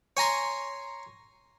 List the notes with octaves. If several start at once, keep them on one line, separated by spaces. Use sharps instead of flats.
C#5 G#5 A#5 C6